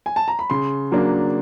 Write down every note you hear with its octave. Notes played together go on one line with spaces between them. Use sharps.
G#5
A5
A#5
B5
C#3 C6
F#3 A#3 D4